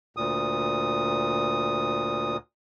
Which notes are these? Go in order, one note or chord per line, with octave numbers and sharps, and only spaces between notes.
D2 A#2 D#6